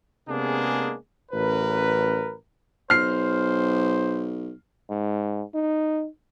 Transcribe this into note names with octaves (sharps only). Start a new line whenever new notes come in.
C3 G#3 A#3 B3 D4 G#4
A1 F#2 A#4 B4
B1 C5 F6 C7
G#2
D#4